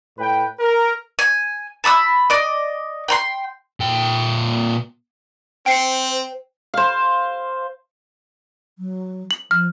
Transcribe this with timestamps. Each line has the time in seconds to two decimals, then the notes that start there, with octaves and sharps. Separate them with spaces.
0.19 A2 B4 G5
0.60 A#4
1.19 G#5
1.84 A5 B5 D#6 E6
2.30 D5 D#5
3.08 G5 A#5 C6
3.80 A#2 G5
5.66 C4 C5 G5 C7 C#7
6.74 C5 F5
8.79 F#3
9.31 F#7
9.51 F3 F6